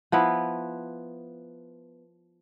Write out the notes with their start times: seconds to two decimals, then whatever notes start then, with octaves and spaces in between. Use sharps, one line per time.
0.12 F3 B3 E4